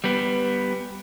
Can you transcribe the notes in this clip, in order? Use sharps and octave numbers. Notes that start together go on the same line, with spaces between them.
G3 B3